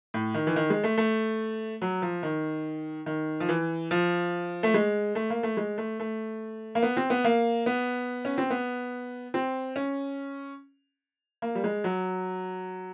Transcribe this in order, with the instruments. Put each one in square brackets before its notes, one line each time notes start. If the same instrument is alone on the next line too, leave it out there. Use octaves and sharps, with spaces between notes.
[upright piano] A2
D#3
E3
D#3
G#3
A3
A3
F#3
F3
D#3
D#3
F3
E3
F3
A3
G#3
A3
A#3
A3
G#3
A3
A3
A#3
B3
C4
B3
A#3
B3
C#4
C4
B3
C4
C#4
A#3
G3
G#3
F#3